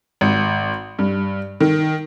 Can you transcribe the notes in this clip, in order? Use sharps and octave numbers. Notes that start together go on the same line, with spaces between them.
G#1
G2
D#3